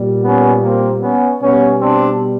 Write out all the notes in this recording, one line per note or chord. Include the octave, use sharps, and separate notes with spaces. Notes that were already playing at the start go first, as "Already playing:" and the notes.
Already playing: A#2 G3
B3 C#4
A#3 C4
B3 C#4
B2 G3 B3 C#4
C4 D4